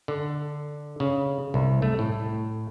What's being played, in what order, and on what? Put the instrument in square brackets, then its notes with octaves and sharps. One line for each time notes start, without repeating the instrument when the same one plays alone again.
[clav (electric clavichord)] D3
C#3
C2
A3
A2